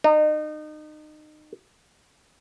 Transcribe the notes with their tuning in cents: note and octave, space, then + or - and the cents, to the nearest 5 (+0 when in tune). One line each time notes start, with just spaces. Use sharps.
D#4 -30